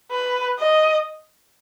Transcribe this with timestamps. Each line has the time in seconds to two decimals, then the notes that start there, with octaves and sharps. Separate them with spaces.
0.11 B4
0.59 D#5